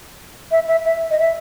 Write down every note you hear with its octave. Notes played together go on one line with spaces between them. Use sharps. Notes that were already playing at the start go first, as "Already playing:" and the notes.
E5
E5
E5
D#5
E5